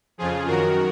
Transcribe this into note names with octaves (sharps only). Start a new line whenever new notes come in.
F2 C#3 F3 F4 G#4
F#2 D#3 F#4 A#4